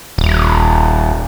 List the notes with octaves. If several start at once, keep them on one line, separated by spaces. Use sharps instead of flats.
D#1